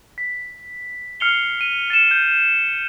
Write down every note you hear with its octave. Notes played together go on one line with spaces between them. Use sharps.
B6
F6 C7 C#7 F7 G7
D#7
A6 C#7 E7
G6